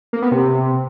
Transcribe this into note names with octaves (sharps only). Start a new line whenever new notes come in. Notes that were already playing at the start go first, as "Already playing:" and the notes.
A#3
B3
C3